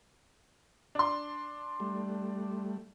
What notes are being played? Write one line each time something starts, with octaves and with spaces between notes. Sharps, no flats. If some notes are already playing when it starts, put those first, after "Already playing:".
D4 C6
G3 A3